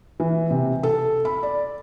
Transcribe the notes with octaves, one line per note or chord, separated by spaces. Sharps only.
E3
C3
A4
B5
D5